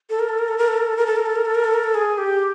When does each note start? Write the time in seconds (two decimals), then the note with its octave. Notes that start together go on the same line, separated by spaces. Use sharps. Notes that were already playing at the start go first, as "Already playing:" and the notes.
0.10 A4
0.19 A#4
0.29 A4
0.38 A#4
0.48 A4
0.58 A#4
0.68 A4
0.77 A#4
0.87 A4
0.97 A#4
1.06 A4
1.16 A#4
1.26 A4
1.36 A#4
1.45 A4
1.55 A#4
1.65 A4
1.74 A#4
1.84 A4
1.95 G#4
2.18 G4